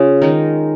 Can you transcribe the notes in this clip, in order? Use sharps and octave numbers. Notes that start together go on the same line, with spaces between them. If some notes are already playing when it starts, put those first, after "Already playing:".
Already playing: C#3 C#4 F4 G#4
D#3 G#3 D#4 A#4